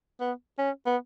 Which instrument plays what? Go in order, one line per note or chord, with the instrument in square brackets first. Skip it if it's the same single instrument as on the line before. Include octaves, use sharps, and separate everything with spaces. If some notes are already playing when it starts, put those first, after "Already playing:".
[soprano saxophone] B3
C#4
B3